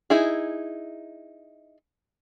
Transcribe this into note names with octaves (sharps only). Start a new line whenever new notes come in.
D#4 E4 G#4